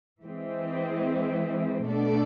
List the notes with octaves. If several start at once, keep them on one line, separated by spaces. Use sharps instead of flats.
E3 G#3 C4
B2 A3 D4 A4 D5